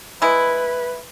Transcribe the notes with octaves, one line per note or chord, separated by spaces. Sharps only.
G#3 E4 B4